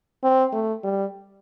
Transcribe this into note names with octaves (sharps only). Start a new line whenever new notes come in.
C4
A3
G3